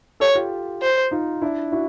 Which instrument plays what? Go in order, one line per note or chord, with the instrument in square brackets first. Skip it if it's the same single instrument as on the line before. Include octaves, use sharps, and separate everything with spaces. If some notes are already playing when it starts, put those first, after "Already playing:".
[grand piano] G4 A4 [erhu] C#5
[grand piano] F4 G4
[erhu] C5
[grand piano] D#4 F4
D4 E4
E4 F#4